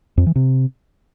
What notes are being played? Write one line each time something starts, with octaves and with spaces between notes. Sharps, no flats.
F2
E3
C3